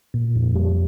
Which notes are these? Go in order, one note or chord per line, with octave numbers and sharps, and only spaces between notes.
A#2
F2
G3